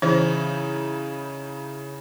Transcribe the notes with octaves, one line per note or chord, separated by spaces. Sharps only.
C#3 E3 D#4 E4 C5